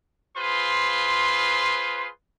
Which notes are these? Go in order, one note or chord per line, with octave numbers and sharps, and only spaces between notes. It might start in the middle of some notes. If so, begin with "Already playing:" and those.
F4 G#4 B4 C5 C6